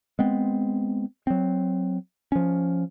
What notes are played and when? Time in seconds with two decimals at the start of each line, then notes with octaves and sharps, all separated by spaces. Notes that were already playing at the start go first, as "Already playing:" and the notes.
0.19 G#3 B3 C4
1.27 F#3 C4
2.32 F3 C#4